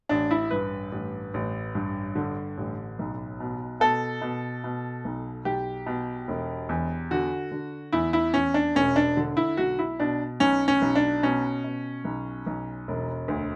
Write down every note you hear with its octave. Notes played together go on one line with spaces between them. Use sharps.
A1 D4
E4
G2 B4
A1
A1
G2
D3
A1
B1
B2
B2 A4
B2
B2
B1
B1 G4
B2
E1
E2
D3 F#4
D3
E2 E4
E4
E2 C#4
D4
E1 C#4
D4
D3
E4
B1 F#4
E4
B2 D4
B1 C#4
C#4
B1
D4
B2 C#4
B2
B1
B1
E1
D2